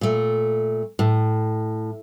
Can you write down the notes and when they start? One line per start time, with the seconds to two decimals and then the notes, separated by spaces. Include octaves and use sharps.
0.01 A#2 A3
0.99 A2